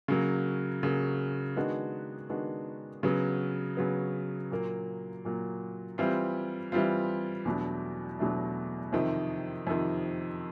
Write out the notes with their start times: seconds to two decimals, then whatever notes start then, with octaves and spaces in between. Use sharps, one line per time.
0.08 C#3 F#3 A#3
0.83 C#3 F#3 A#3
1.56 D#3 G#3 B3 D4 F#4
2.30 D#3 G#3 B3 D4 F#4
3.03 C#3 F#3 B3
3.77 C#3 F#3 B3
4.51 A#2 F#3 A#3
5.25 A#2 F#3 A#3
5.98 E3 G3 C4 F4
6.72 E3 G3 C4 F4
7.45 E2 B2 F#3 A3 D4
8.19 E2 B2 F#3 A3 D4
8.93 F2 C3 D#3
9.67 F2 C3 D#3